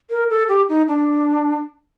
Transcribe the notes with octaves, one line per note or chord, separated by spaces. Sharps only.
A#4
A4
G4
D#4
D4